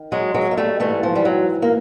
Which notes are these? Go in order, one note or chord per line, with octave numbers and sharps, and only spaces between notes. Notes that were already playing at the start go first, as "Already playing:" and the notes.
Already playing: D#3
F#3 G#3
F#3 G#3
A#3
G3 A3
G#2 E3 G3 A3
F3
G3
F#3
A#3